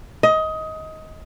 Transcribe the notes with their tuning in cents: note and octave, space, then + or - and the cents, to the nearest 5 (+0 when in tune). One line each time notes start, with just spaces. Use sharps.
D#5 +20